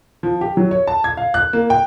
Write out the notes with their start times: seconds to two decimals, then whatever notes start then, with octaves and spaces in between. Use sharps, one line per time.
0.23 F3
0.41 G4
0.57 F#3
0.71 C#5
0.87 A5
1.04 G#6
1.17 F5
1.34 F#6
1.53 A#3
1.70 G5